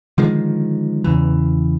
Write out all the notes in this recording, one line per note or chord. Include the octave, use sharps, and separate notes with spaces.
D3 D#3 F3 G#3
E2 C#3 E3